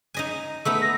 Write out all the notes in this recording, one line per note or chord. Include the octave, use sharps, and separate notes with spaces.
D#4 D#5 G#5
A3 B3 D#4 E6
A#6